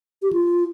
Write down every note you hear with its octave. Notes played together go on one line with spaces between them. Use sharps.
G4
F4